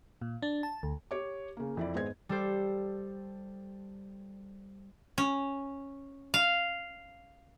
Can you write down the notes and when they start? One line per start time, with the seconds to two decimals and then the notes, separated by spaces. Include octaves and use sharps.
0.22 A#2
0.42 D4
0.63 A5
0.83 D2
1.11 G4 C#5 D6
1.57 C#3 A#3
1.77 F2 E4 D5
1.94 G#1 G#3 B3 C5 G#6
2.29 G3 A4 C5
5.18 C#4
6.34 F5